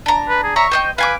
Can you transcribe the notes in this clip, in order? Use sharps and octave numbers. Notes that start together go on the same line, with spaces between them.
D4 A#5
B4
G#4
C#5 E5 A#5 C#6
C5 D#5 G5
B4 F5 G#5 D6